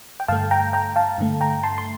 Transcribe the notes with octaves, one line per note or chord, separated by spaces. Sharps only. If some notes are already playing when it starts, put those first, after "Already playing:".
G5
G2 D3 A3 F5 A5
G5 A#5
G5 A#5
F5 A5
G2 D3 A3
G5 A#5
A5 C6
C6